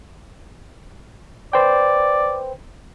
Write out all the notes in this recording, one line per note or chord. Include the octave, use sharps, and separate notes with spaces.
B4 C5 D5 G5